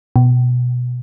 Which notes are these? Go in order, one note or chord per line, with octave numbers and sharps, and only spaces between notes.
B2